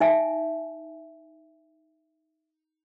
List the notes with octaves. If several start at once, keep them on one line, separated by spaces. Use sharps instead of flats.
D#4 E5 G#5